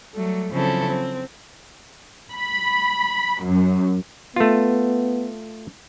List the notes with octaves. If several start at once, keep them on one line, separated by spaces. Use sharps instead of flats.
F#3 G3 A3
C#3 F3 F#3 C4 E4 A4
C4
B5
F#2
A3 B3 F4